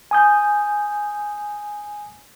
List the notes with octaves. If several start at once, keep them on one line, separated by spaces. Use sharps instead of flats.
G#5 D#6 G6